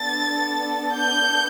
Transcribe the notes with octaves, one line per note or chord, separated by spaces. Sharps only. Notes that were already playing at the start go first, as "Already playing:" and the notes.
Already playing: B3 D4 A4 A6
G6